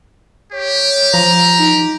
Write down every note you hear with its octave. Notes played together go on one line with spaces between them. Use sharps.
G4 C#5
F3 A#5
D#4